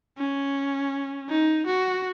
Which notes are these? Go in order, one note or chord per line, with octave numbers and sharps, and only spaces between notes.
C#4
D#4
F#4